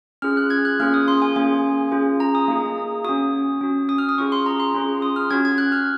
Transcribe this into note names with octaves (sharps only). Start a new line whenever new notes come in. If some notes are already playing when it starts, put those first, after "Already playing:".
C#4 F4 G#4 F6
F#6
G#6
F#6
A#3 C#4 F4 G#4 F6
D#6
C6
G#5
A#3 C#4 G#4 G#5
C#4 F4 G#4
A#5
D#6
A#3 D#4 G#4
C#4 F#4 D#6
C#4 F#4
D#6
F6
D#6
C#4 F4 G#4 C#6
C6
A#5
C6
C#4 F4 G#4
D#6
F6
C#4 F#4 G#6
G#6
F#6
F6